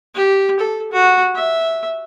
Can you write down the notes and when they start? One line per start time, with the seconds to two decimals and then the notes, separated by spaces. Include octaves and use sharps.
0.15 G4
0.59 A4
0.92 F#4
1.35 E5